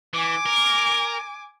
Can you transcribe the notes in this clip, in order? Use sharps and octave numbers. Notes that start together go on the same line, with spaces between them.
E3 G#5 D6
A#4